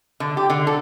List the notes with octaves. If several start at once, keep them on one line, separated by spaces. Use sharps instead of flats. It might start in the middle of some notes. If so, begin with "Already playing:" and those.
D3
G4
D3
A4